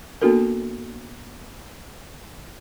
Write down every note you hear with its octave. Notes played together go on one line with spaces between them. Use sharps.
A#3 B3 D4 F#4 A4 A#4